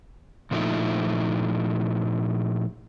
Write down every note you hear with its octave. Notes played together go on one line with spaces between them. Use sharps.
A#2 F3 A3 D#4 E4